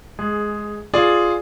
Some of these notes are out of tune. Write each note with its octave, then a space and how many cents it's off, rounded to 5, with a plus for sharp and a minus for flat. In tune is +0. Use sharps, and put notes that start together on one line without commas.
G#3 +15 G#4 +0
F4 +0 G#4 +0 D5 +0